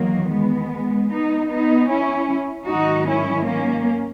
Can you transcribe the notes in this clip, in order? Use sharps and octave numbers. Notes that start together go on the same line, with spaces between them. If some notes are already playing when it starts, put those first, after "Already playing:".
Already playing: E2 D#3 F#3 A#3
G#3 B3
B3 D#4
B3 D#4
C#4 E4
G#2 D#3 F#3 D#4 F#4
C#4 E4
A#3 C#4